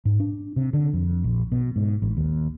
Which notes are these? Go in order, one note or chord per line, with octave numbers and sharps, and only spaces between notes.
G#2
D4
C3
D3
F2
A#1
B2
G#2
A1
D#2